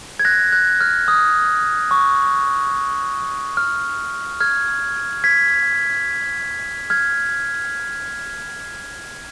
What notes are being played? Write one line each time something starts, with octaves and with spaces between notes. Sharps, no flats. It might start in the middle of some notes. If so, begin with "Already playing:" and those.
G#6
F#6 A#6
F#6
F6
D#6
C#6
F6
F6 G#6
G#6 B6
F6 G#6